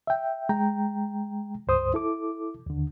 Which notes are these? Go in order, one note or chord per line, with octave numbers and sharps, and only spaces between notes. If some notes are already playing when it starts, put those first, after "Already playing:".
E5 G5
G#3 G5 A#5
C#2 G2 C5 D#6
E4 A4 D6
D#2 D3